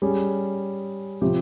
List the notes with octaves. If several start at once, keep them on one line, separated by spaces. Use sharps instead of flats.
G3 C#4 G#4
C3 F3 C4 G4